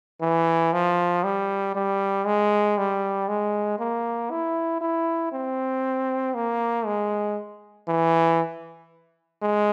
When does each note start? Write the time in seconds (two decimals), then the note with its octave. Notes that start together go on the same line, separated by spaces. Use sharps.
0.21 E3
0.73 F3
1.24 G3
1.75 G3
2.26 G#3
2.78 G3
3.29 G#3
3.79 A#3
4.31 E4
4.81 E4
5.33 C4
6.34 A#3
6.86 G#3
7.88 E3
9.42 G#3